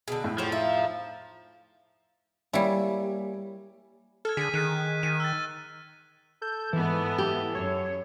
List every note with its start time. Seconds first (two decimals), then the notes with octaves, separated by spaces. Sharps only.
0.08 B2 D3 G#4 A5
0.24 F2 A2 E4 G#4
0.38 F3 F#4 G4 C#5
0.52 D#4 F4 E5
2.53 G3 A#3 E4 C#5 G#5
4.25 A4 F6 G#6
4.37 D3 G#4 B6 D#7
4.54 D#3 F6 F#6 D#7
5.03 D#3 D#7
5.20 E6 F#6 A6
6.42 A4 G6
6.73 G#2 E3 B3
7.18 G4
7.55 F#2 C#5